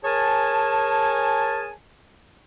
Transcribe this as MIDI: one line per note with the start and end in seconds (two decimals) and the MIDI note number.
0.05 1.71 68
0.05 1.71 70
0.05 1.71 73
0.05 1.71 80
0.05 1.71 81